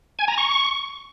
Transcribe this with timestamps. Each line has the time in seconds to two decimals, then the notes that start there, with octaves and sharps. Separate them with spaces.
0.19 G#5
0.28 A#5
0.38 C#6